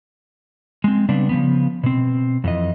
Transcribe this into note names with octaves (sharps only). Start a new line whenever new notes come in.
G#3 C4
C#3 G3 B3 C4 D4
C#3 F3 B3
B2 C4
F2 E3 D#5